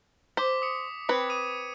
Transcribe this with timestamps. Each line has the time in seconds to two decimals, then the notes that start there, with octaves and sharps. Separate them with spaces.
0.37 C5 D6 B6
0.62 D#6 C#7
1.09 C4 B4 G#6 C#7
1.30 D6 D#6 D#7